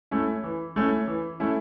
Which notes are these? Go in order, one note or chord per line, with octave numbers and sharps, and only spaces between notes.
A3 C#4 E4
E3
A3 C#4 E4
E3
A3 C#4 E4